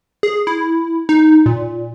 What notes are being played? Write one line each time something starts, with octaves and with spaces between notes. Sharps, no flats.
G#4
E4
D#4
A#2